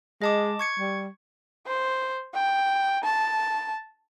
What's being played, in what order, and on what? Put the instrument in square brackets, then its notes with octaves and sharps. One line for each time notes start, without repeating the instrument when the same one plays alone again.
[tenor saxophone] G#3 [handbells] D#5 A5 D6
[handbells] C#6 G#6 C#7
[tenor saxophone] G3
[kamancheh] C5
G5
A5